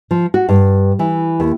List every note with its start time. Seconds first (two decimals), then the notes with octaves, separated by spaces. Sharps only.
0.11 F3
0.34 F#4
0.49 G2
0.99 E3
1.40 D#2